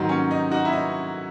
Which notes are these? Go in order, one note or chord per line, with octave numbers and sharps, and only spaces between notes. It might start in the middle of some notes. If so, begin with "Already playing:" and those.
Already playing: G#2 D#3 F#3
C#4
D#4
D#4 F#4
E4
D#4